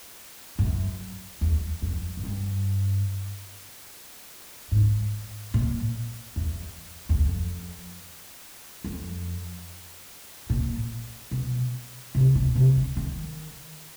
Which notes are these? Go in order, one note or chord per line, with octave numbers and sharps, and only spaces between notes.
F#2
E2
F2
F#2
G2
G#2
A#2
E2
E2
F2
F2
A#2
B2
C3
B2
C3
D3
D#3